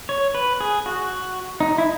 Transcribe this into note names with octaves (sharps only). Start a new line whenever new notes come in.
C#5
B4
G#4
F#4
D#4
E4